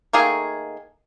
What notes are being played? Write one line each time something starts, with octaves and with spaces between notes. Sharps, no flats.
D#3 A3 A#3 G#4